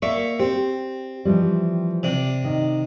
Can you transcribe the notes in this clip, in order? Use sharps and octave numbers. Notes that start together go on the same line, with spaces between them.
A#3 D5 E5 C#6
C4 G4
E3 F3 G3
C3 D4
D#3